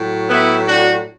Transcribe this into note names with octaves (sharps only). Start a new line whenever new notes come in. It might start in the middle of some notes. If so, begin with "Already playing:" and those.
Already playing: A2 F#3
B3 E4
D4 F#4